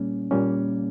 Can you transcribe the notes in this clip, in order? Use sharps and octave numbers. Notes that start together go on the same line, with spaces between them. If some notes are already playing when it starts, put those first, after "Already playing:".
Already playing: A#2 G3 A#3 C#4
A#2 G3 A#3 C#4